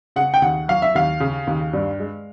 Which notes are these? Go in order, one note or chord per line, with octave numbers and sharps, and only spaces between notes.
C#3 F#5
G5
D#2 F#5
F#3 F5
E5
D#2 F5
C#3
D#2
G2
G#3